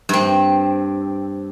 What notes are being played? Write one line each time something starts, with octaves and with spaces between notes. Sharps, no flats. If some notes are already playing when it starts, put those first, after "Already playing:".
G2 C4